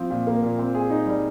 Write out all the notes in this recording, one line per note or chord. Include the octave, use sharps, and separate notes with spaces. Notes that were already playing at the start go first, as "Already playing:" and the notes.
Already playing: F3 C4
A#2
A#3
A#2
C4
G#4
D#4
G3